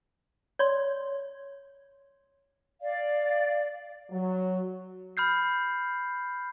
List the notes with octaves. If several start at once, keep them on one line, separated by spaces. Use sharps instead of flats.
C#5 D5 C6
D5 F5
F#3
B5 F6 G6 C7